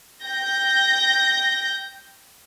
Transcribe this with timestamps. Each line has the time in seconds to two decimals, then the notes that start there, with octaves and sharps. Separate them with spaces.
0.24 G5 G6 A#6